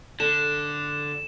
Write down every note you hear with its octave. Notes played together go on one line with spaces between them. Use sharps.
D3 A4 E7